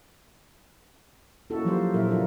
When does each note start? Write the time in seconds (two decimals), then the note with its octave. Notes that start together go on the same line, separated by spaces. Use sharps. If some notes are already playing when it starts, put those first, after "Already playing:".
1.50 A#3 C#4 D#4 E4 F#4 A4
1.65 F3 F#3 A#3 F4 G4 C5
1.93 A#2 F#3 E4 A#4 E5
2.09 C#3 A#3 D4 D#4 F4 A4